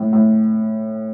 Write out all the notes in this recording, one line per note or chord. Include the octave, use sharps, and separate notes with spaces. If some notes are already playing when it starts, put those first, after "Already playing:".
Already playing: A2
A2